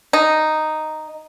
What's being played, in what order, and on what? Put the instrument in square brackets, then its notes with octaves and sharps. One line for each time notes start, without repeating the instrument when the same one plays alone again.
[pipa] D#4